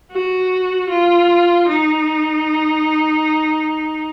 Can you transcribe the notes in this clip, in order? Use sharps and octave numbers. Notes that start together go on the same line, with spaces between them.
F#4
F4
D#4